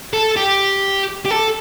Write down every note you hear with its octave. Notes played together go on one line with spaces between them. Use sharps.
A4
G4
G4
A4